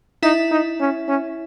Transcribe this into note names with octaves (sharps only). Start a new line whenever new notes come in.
D#4 E4 E5
D#4
C#4
C#4